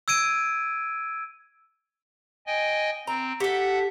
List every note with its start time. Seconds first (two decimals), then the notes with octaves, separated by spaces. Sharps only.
0.08 E6 G#6 D7 D#7
2.47 D#5 G5 G#5
3.07 C4 A#5
3.40 G4 A4 E5 F#5